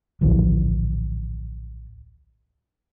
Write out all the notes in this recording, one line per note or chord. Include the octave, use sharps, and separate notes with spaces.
D1 A#1 E3 F3